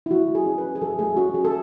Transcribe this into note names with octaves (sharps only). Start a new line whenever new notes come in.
E4
F#3 F#4
A3
G#4
C#4
B4
F#3
G#4
F#3 A4
A3 G#4
C#4 F#4
F#3 G#4
A4